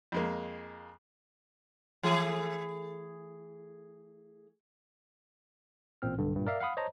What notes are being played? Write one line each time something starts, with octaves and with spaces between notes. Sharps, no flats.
F2 G#3 A#3
E3 A3 G#4
A1 A#2 C4 F6
B1 G2 D3
G2 A#2
A#4 D5 E5 F5
F5 F#5 B5 D#6
C5 C#5 D#5 A5 A#5